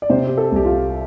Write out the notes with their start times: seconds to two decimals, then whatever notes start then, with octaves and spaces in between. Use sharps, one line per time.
0.02 D5
0.10 C3 C5
0.26 G4
0.38 A4
0.52 C2 G4
0.65 F4